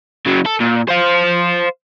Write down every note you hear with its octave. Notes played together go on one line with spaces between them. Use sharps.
C#3 F#3
A4
A#2
C5 F5